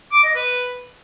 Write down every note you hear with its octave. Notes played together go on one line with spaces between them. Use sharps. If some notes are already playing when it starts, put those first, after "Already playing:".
D6
D#5
B4